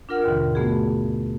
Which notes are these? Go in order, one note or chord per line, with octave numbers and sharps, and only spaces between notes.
D4 F4 A#4 F#5 F6
D#2 G#2 B2 D3 E3
A3 B3 F#4 G#4